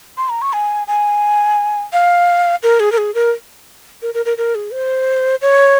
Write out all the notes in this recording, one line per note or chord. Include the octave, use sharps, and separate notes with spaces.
C6
A#5
C#6
G#5
G#5
F5
A#4
G#4
A#4
G#4
A#4
A#4
A#4
A#4
A#4
G#4
C5
C#5